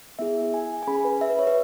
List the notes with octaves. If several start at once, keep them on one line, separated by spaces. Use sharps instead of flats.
B3 E4 G#4 E5
G#5
G#5
C#4 G#4 B5
B4
E5
B4
C#5
B4